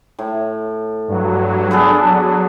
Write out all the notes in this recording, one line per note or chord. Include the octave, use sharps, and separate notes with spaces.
A2
G2 F#3
B3 D4 G#4 A4
F#3